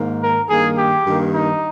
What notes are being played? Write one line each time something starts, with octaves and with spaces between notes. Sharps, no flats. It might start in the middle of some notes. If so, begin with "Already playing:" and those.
Already playing: G#2 D#3 A#3
A#4
G2 D#3 A#3 G#4
G4
G2 D#3 A#3
D#4